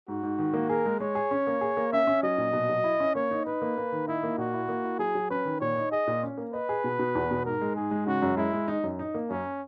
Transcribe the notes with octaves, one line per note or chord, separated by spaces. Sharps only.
G#2 F#4
G#2
D#3
A#3
G#4 A#4
G#3
G#3 C#5
G#4
C#4
A#3
G#4
A#3
C#4 E5
C#4
F#3 D#5
A#2
B2
F#3
E4
C#4
A#3 C#5
D#4
D#4 B4
A#3
A#3
D#3
D#4 E4
A#3
A#2 F#4
E4
A#3
E4
F#3 G#4
F#3
C#4 B4
D#3
A#2 C#5
D#4
G#4 D#5
A#2
C#4
A#3
B4 D#5
G#4
B2
B2
E2
B2
G#2 A#4
G#3
G#2 G#4
G#3
C#3 F#4
F#2
G#3 E4
G#3
D#4
F#2
D#4
A#3
F#2 C#4